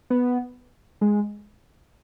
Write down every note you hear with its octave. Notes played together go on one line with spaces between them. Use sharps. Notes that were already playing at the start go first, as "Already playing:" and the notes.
B3
G#3